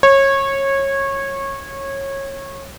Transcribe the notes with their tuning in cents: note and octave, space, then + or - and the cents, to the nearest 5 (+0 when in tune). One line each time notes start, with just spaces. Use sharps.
C#5 -20